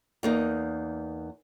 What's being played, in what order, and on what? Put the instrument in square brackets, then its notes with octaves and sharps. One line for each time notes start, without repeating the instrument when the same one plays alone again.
[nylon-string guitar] E2 A#3 D#4